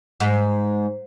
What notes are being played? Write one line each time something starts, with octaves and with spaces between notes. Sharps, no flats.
G#2